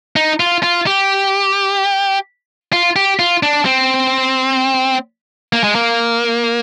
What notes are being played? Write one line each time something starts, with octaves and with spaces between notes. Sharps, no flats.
D#4
F4
F4
G4
F4
G4
F4
D4
C4
A#3
G#3
A#3